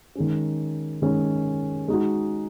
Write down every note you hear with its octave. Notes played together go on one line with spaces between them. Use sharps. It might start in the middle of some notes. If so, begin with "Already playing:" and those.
D#3 G#3 C#4
D#3 G#3 C#4
G#3 D#4 F#4